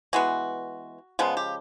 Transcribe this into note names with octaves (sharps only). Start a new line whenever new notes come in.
E3 G#3 B3 F#4
C#3 F3 G#3 B3
G4